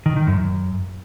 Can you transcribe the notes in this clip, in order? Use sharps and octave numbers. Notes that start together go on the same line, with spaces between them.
D#3
D#3
F#2
F#2